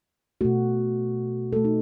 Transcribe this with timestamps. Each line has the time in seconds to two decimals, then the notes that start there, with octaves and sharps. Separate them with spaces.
0.41 B2 A3 F#4
1.52 B2 A4
1.56 A3
1.64 D#4